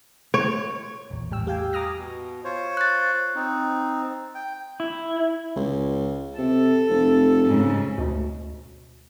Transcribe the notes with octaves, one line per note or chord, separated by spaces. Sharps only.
C#5
A#1 E2 A#2
E2 A2 G3 G5 E6
G4 F5 G5 G#5
G#5 A#5 D6 D#6 F6 A#6
B2
F4 C5 C#5
F#6 A6
C4 D#4
G5
E4
C#2
C3 A4
F1
G#2 C#3
D2 B2